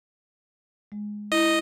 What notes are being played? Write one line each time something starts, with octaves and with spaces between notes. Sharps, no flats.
G#3
E4 D#5